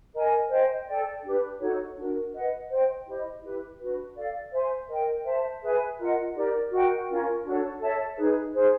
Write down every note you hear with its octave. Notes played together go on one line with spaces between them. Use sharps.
A#4 D#5 G#5
C5 D#5 G5
A4 D5 G5
D4 G4 B4
D#4 F#4 A4 C#5
D4 F#4 A#4
B4 D#5 F#5
C5 D#5 G5
E4 G4 C5 D#5
E4 G4 B4
D4 F#4 B4
A4 D5 F5
C5 E5 G#5 C6
A#4 D#5 G5
C5 E5 A5
G#4 B4 E5 G#5
F4 A#4 D#5 F#5
D#4 G4 A#4 D5
F#4 A#4 D#5 G5
C#4 F4 A#4
D4 F#4 A4 C#5
A4 C#5 E5 A5
D#4 G#4 B4
D#4 G#4 C5